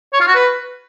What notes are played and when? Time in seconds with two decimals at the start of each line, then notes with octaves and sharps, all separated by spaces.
0.13 C#5
0.20 F4
0.27 F#4
0.35 B4